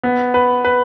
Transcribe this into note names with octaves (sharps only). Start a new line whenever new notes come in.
B3
B4
B4